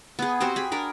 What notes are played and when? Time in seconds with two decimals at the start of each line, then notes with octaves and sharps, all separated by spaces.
0.19 B3 G#4
0.40 C4 F#4 G4 C5
0.56 G#4 B5
0.72 D4 A#4 B5